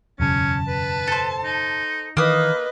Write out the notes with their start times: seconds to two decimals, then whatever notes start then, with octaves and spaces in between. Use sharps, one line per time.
0.20 E1 F#2 C#3 C#4 A5
0.68 B4
1.07 A4 C5
1.44 D#4
2.17 D#3 E3 A#3 B4 D#5 D#6